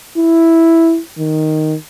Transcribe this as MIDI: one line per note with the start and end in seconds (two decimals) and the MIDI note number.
0.17 0.99 64
1.19 1.75 51